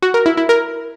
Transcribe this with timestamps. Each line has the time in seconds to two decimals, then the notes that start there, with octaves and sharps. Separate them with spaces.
0.02 F#4
0.14 A#4
0.26 E4
0.37 E4
0.49 A#4